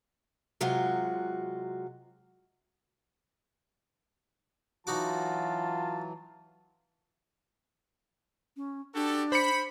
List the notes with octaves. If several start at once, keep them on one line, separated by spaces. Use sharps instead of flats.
C3 F#3 G#3 F4 F#4
E3 F#3 D#4 F4 F#4 A5 D6
C#4
D4 F#4 G4 A4
C5 B5 C#7